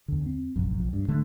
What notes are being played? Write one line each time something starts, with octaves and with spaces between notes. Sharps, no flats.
E2 D3
C4
F1 A#1 F#2
B1 F3
G2
A2 D3 A3